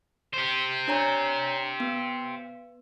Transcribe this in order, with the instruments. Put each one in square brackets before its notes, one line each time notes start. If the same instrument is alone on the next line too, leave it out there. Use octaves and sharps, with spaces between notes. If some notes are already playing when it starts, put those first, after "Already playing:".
[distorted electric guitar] G4 C5
[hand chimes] D4 C#5 A#5
B3